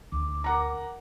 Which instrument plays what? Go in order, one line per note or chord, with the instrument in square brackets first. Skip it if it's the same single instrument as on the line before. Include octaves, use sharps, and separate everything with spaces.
[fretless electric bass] D2 [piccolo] D6
[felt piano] A#4 F#5 A#5